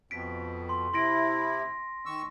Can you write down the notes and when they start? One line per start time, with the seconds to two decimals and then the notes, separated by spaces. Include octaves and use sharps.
0.11 F2 B2 B6 D7
0.69 C6
0.93 C3 E4 C6 A#6 D7
2.06 D#3 C#6 E6